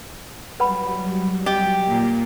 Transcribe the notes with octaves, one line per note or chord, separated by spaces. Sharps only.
F#3 G3 B4 F#5 B5
G4 D#5
A#2